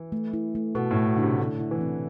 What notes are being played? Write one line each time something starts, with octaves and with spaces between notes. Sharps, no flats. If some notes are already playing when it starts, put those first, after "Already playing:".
Already playing: E3
A3
E4
A3
B2 A4
A2
A3
B2
D3 E4
C3
D3 A4
E4
E3
C4